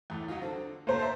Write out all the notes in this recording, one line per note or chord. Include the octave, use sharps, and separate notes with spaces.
E2 A2
F#3 D#4 F4
D3 C4
C3 A3 A#3 C5 A#5
E5 A5